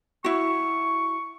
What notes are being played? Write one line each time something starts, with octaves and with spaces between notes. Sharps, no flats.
E4 F#4 C#6